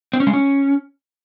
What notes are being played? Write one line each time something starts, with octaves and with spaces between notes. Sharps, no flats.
C4
C#4
G#3
C#4